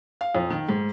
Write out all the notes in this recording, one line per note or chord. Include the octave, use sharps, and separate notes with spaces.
F5
F2
D#3
G#2